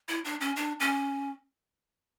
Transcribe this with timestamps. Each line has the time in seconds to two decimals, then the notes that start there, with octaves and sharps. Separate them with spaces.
0.09 E4
0.25 D4
0.41 C#4
0.56 D4
0.80 C#4